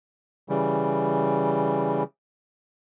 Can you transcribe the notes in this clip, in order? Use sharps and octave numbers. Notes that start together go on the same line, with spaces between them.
C#3 E3 G3